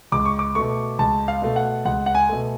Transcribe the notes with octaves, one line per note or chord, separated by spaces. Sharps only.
C#2 D6
C#6
D6
B2 A3 C#6
C#2 A5
F5
B2 A3
F#5
C#2 F#5
F#5
G#5
B2 A3